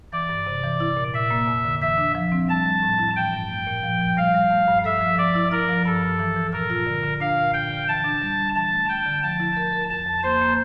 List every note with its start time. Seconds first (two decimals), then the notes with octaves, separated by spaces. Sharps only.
0.12 E3 D5
0.29 G2
0.46 C3
0.63 E3
0.80 E4
0.97 A#2
1.14 A#2 E5
1.31 A#3
1.48 F2
1.64 D3
1.81 E3 E5
1.98 D4
2.15 F3
2.32 C4
2.48 G3 A5
2.66 G3
2.82 A2
2.99 E4
3.16 E3 G5
3.33 G2
3.49 A3
3.67 A#2
3.83 F3
4.01 F3
4.17 G3 F5
4.34 G3
4.51 A3
4.68 G2
4.84 A4 E5
5.01 F3
5.18 F3 D5
5.35 E4
5.51 E4 A#4
5.68 F3
5.86 G2 A4
6.02 G2
6.19 E3
6.36 E3
6.53 A#2 A#4
6.70 F4
6.86 D3
7.04 D3
7.20 D4 F5
7.37 A#2
7.53 D3 G5
7.71 D3
7.88 E3 A5
8.04 D4
8.22 G3
8.39 G3
8.55 E3 A5
8.72 A3
8.89 A3 G5
9.06 D3
9.23 F3 A5
9.40 E4
9.57 A#4
9.73 A#4
9.90 F2 A5
10.07 F2
10.23 A#3 C5
10.41 A#3